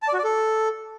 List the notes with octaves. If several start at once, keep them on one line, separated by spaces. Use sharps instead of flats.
A5
D5
F#4
D5
A4